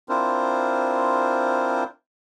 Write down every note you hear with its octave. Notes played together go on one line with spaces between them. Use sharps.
C4 D4 E4 F4 A#4 C5